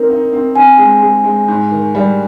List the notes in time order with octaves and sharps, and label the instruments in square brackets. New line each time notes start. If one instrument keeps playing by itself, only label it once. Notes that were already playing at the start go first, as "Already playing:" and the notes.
Already playing: [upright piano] C4 D#4 [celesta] A#4
[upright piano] D#4
C4
[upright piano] C4 [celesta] G#5
[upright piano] G#3
G#3
G#3
G#2
D#3
G3